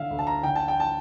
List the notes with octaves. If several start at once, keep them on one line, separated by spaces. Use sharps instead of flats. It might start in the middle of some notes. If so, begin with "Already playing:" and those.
Already playing: D3 E5 F5
D2
A5
A#5
D3 G5
A5
G5
A5